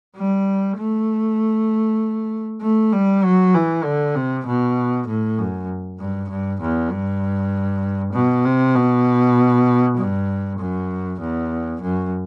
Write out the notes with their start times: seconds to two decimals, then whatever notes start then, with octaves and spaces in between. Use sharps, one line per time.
0.16 G3
0.77 A3
2.62 A3
2.93 G3
3.24 F#3
3.54 E3
3.84 D3
4.15 C3
4.46 B2
5.07 A2
5.38 F#2
5.99 G2
6.29 G2
6.61 E2
6.91 G2
8.13 B2
8.45 C3
8.75 B2
9.97 G2
10.59 F#2
11.21 E2
11.81 F#2